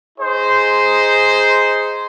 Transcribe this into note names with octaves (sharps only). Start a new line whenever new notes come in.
D#4 G#4 C5